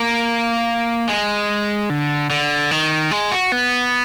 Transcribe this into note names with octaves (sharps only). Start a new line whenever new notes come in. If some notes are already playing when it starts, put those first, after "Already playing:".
Already playing: A#3
G#3
D3
D3
D#3
G#3
F#4
B3